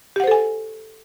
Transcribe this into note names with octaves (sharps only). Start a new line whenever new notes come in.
G4 A4 C5 F#5 G#5